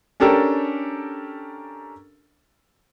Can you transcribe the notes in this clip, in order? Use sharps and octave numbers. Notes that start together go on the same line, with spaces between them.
C#4 D4 G4 A4 A#4